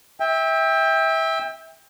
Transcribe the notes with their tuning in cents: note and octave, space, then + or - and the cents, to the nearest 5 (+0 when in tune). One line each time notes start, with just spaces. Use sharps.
E5 -20 G5 +25